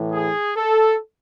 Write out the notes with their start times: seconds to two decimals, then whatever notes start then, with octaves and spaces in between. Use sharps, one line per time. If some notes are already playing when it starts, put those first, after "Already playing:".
Already playing: A2 E3
0.13 G#4
0.57 A4